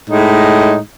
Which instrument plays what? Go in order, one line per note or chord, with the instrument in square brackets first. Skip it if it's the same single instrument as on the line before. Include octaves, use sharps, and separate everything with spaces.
[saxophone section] A2 G#3 D#4